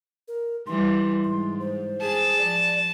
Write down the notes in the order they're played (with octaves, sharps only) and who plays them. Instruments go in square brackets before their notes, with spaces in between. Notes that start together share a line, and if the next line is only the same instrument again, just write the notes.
[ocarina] A#4
[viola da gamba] E3 G3 [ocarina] C6
[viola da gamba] G#2 [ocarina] C6
[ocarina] C5
[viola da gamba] G#4 [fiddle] A5
[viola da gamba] F3 [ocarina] D5